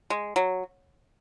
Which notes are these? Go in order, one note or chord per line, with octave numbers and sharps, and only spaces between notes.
G#3
F#3